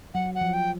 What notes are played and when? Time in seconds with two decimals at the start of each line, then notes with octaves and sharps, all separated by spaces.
0.14 F#3 F#5
0.35 F#5
0.41 F3
0.54 G5